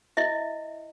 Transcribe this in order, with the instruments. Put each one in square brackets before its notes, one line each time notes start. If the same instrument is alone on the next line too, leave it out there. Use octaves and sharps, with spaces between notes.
[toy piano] E4 D#5 E5